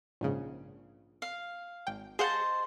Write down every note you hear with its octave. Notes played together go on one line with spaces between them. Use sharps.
A#1 G#2 C#3
F5
G#1 G5
G#4 C5 D#5 F5 F#5 A5